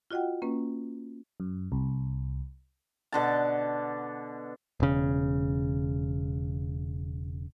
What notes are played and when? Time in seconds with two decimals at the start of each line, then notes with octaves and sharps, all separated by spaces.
0.11 F4 F#4 D#5 F#5 G5
0.42 A#3 C#4 B4
1.40 F#2
1.72 C2
3.12 B2 D3 A5
4.80 E1 C#3